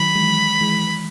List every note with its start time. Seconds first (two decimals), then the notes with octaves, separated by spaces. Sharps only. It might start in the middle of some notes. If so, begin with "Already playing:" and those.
Already playing: D#3 F#3 B5
0.15 E3 G#3
0.61 E3 G#3